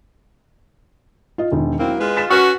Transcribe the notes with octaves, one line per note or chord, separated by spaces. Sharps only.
F4 D#5
E1 D#3
F#3 A#3 C4 E4
G#3 F4 B4
A6 B6 E7
C#4 F#4 B4 F6